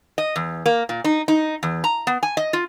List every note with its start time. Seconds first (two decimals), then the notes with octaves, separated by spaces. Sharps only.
0.18 D#5
0.36 E2
0.66 A#3
0.89 A#2
1.04 D#4
1.28 D#4
1.63 E2
1.84 A#5
2.07 B3
2.23 G#5
2.37 D#5
2.53 F4